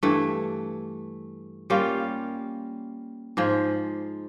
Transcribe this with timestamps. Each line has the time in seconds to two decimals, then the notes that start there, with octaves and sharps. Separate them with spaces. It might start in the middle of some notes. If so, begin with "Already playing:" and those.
0.03 G2 E3 A3
1.70 G3 A#3 C#4 F4
3.37 G#2 F3 G#3